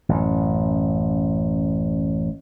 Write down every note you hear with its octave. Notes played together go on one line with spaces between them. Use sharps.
A1 F#2